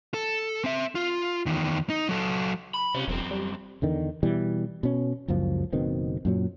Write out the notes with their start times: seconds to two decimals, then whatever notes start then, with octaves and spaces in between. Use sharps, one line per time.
0.14 A4
0.64 C4 E5
0.95 F4
1.46 E2 D#3
1.90 D#4
2.09 F#3 A4
2.74 B5
2.94 C3 C#4 F4
3.07 E1 F#2 C4
3.31 G3
3.82 E2 D3 D#3
4.23 B2 E3 G3
4.83 B2 C#4
5.28 F#1 C#2 F#2 F3
5.73 F#1 B2 D#3 C4
6.25 F#2 A#2 F#3